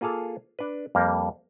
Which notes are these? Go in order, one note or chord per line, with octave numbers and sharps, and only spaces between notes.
A#3 F4 G#4 A4 F5
D4 B4
F2 G3 A#3